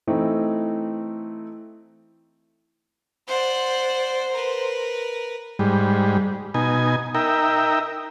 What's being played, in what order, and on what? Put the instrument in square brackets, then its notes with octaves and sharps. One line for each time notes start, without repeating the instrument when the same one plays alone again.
[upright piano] E3 A3 C4 D#4
[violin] C5 [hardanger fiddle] D5 F#5
[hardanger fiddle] A#4 B4
[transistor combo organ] G#2 G3
B2 D#4 G#5
D#4 A#4 E5 G5